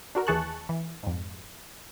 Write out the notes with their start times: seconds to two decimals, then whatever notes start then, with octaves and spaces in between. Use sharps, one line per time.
0.15 D4 F#4 A#4
0.27 D#2 E3 G#4 A5 C#6 F#6
0.69 E3
1.03 F2 G#2